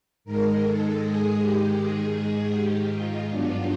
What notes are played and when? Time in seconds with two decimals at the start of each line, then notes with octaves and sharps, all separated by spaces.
0.25 G#2 D#3 G#3 A#4
0.63 A4
1.01 G#4
1.39 G4
1.77 G#4
2.52 G4
2.91 F4
3.28 G2 D#3 F#3 B3 D4 F4